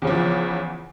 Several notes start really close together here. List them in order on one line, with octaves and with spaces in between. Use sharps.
E2 C#3 F3 E3